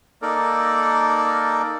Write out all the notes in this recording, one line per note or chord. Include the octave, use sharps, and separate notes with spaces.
A#3 D#4 A4 A#4 D5